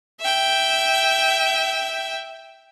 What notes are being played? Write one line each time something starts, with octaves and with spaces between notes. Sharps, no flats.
E5 G5